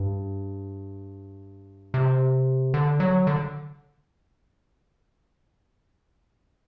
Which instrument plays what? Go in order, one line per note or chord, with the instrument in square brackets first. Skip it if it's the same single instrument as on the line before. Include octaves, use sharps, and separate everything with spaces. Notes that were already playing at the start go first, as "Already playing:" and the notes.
Already playing: [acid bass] G2
C3
D3
F#3
D3